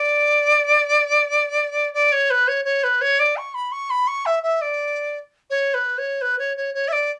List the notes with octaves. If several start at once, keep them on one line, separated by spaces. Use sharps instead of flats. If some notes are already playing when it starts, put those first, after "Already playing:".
Already playing: D5
D5
C#5
B4
C#5
C#5
B4
C#5
D5
C#6
B5
C#6
B5
C#6
E5
E5
D5
C#5
B4
C#5
B4
C#5
C#5
C#5
E5
D5